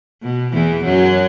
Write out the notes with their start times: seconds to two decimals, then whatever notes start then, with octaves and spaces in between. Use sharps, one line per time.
0.23 B2
0.53 E2 E3
0.84 F#2 F#3